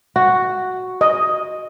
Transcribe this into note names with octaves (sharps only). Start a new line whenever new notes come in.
F#4
D#5